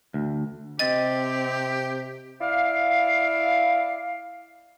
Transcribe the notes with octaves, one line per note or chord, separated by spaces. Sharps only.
D2
C3 C4 G4 D#5 A6
E4 D5 F5